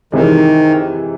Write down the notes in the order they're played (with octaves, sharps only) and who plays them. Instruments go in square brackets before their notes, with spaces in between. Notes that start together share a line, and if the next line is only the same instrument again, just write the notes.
[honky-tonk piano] C3 E3 G#3 [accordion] D#3